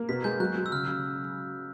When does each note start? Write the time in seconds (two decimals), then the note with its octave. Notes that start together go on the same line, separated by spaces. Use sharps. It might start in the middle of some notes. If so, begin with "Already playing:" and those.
Already playing: A#3
0.09 B2 B6
0.24 G#3 G6
0.40 F#3 F#6
0.56 F#3
0.66 E6
0.72 C#3 F6
0.88 C#3